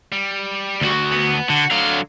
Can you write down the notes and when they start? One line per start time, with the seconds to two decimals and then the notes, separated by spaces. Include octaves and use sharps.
0.12 G3
0.81 D2 F#4
1.12 B3
1.50 D3 F#4
1.71 D3 F#3 F5